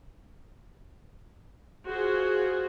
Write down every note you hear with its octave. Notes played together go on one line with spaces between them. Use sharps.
F4 F#4 G#4 C5